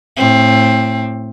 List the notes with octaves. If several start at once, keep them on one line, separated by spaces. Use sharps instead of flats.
A2 C4